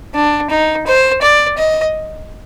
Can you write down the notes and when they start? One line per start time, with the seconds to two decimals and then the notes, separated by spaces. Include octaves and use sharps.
0.15 D4
0.50 D#4
0.87 C5
1.22 D5
1.58 D#5